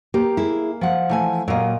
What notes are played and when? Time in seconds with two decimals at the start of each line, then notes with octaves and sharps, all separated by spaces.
0.14 A#3 G4
0.37 E4 G#4
0.81 F3 F#5
1.09 E3 A3 G#5
1.48 A#2 F#3 A#3 D#5